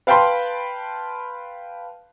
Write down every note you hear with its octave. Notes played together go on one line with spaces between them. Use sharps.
B4 F5 G5 A5 B5 C6